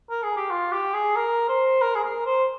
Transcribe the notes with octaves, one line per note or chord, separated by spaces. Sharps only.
A#4
G#4
G4
F4
G4
G#4
A#4
C5
A#4
G#4
A#4
C5